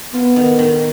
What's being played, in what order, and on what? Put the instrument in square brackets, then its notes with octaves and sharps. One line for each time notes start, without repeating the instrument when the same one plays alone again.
[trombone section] B3 [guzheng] F4
[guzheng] D#3
D#3